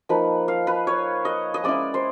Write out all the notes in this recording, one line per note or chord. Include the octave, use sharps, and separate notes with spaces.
F3 A#3 D#4 B4
F5
B4
C#5
D#5
D#5
G#3 C#4 E4 D5
C5